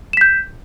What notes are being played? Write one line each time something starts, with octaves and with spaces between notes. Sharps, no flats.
G6 B6 E7